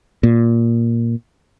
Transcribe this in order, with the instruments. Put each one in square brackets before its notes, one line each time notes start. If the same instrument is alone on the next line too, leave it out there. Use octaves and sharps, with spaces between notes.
[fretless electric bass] A#2